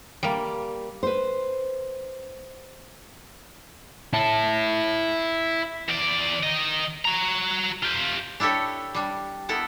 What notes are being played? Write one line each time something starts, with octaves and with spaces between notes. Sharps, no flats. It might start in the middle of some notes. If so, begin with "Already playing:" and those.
G3 A#3
B4 C5
E4 A5
E2 D5
D#3 D#5
F#4 A#5
F4 G4
D4 E4 G4 A4 C#5
G3 D4
B3 E4 A4 A#4